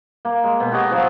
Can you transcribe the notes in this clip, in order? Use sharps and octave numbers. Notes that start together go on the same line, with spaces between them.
A#3
G#3
B2
F#4 G4 C#5 D#5
F3 F#3 F4